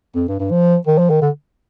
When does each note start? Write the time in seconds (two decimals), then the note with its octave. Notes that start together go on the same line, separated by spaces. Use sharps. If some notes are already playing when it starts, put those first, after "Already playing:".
0.15 F2
0.28 G2
0.40 G2
0.51 F3
0.87 D#3
0.98 F3
1.10 D#3
1.22 D3